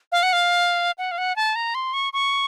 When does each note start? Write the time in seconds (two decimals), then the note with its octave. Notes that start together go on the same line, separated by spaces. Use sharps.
0.12 F5
0.23 F#5
0.33 F5
0.98 F#5
1.11 F5
1.18 F#5
1.36 A5
1.56 A#5
1.75 C6
1.94 C#6
2.13 C#6